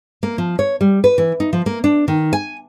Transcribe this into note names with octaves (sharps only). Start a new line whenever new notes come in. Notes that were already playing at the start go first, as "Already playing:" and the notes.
A#3
F3
C#5
G3
B4
E3
D#4
F3
A#3
D4
D#3
G#5